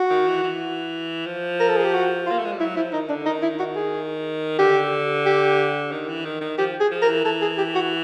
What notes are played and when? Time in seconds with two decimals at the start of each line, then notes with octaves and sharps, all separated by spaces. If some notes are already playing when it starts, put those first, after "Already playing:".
Already playing: F#4
0.10 D#3
0.27 E3
0.44 E3
1.26 F3
1.60 A#4
1.68 A4
1.77 G#4
1.84 G4
1.94 F#4
2.26 A#3 F4
2.39 A3
2.45 G#3
2.52 G3
2.59 F#3 E4
2.76 F3 E4
2.93 D#3 D#4
3.09 D3 D4
3.26 D#3 D#4
3.42 E4
3.59 F#4
3.75 G#4
4.59 D3 G4
5.26 G4
5.92 D#3
6.08 E3
6.25 D#3
6.41 D#3
6.58 F3 G4
6.80 G#4
6.91 F3
7.02 A#4
7.08 E3
7.25 E3 A4
7.42 G#4
7.58 G4
7.75 F#4